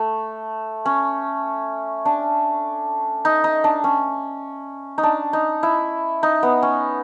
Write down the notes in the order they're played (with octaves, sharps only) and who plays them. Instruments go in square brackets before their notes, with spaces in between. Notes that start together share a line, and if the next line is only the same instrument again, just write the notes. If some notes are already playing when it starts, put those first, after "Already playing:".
Already playing: [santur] A3
C#4
D4
D#4
D#4
D4
C#4
D#4
D4
D#4
E4
D#4
B3
C#4